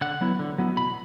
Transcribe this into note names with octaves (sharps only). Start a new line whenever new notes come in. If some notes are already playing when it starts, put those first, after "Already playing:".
D3 F#5
F#3 B3 E4
D3
F#3 B3 E4
B2 B5